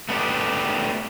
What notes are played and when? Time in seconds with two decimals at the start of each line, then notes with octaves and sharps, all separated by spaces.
0.09 A3 B3 D4 G4